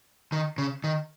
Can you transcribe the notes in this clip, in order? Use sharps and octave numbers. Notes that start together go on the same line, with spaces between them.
D#3
C#3
D#3